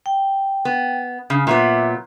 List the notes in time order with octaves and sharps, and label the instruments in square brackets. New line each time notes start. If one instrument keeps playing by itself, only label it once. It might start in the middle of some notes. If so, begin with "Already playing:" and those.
[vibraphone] G5
[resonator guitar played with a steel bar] B3
[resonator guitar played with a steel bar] C#3 [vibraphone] D#6
[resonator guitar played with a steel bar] A#2 F#3 B3 [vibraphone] E5 D6